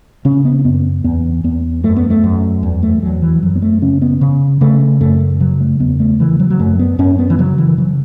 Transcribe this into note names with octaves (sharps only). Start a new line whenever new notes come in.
C#3 C#4
B3
C#4
F#2 B3
E2 B3
E2 B3
F#2 A3
B3
A3
F#2
E2
A3
E2 F#3
E3
F#2 F#3
B3
A3
C#3 C#4
B3
C#3
C#3 A3
F#2 A3
C#3 F#3
A3
E2 B3
A3
C#3 E3
F#3
F#3
F#2 A3
B3
F#2 C#4
B3
E3
C#3 F#3
E3
C#3 F#3